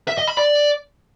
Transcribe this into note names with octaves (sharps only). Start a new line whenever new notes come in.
E5
D#5
B5
D5